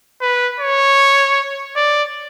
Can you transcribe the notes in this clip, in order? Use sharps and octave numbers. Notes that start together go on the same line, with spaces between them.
B4
C#5
D5